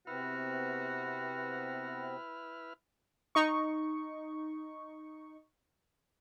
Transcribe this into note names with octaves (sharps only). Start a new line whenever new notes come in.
C3 B3 C4 E4 F#4 B4 F6
D#4 C#6